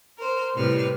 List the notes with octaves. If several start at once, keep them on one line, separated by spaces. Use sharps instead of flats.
A#4 C5
A2 C3 G3 B4 F6